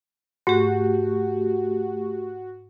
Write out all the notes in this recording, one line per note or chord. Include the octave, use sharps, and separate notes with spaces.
G#2 A3 F#4 G4